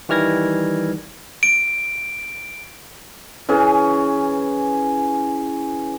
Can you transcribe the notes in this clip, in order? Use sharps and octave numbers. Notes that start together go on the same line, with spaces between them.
D#3 E3 G3 F6 G#6 A#6
D7
E3 C#4 G#4